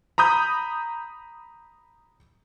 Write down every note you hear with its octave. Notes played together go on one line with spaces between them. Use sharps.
A#5 B5 D#6 G6